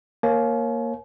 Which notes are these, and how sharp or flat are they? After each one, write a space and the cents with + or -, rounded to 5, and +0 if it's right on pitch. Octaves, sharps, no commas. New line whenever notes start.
A#3 +0 C#5 -20 G#5 +40